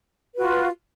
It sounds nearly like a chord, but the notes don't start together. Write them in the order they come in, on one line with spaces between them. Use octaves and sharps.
B4 F#4 F4